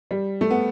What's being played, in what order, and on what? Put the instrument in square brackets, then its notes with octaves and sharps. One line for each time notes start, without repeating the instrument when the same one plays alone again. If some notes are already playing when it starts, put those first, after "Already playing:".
[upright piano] G3
A3
B3